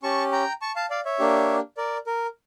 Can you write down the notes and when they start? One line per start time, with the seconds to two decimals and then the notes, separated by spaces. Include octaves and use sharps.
0.03 C#4 G4 A5 C#6
0.32 G5 A#5
0.62 A5 C#6
0.76 F5 A5
0.90 D5 F5
1.05 C#5 E5
1.19 A#3 D4 G4
1.77 A#4 D5
2.07 A#4